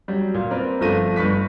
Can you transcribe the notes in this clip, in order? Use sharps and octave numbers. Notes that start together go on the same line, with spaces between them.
F#3 G3
A#2
C4 A#4 B4 D5
G1 F3 A3 A#6 D#7
G1 B4 C#6 B6